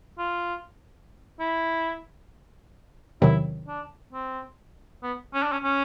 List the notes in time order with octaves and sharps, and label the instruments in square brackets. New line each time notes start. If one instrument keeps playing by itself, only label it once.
[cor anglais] F4
E4
[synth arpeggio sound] E2 C3 D#3 F#3 [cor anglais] E4
[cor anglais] D4
C4
B3
C#4
D4
C#4
C#4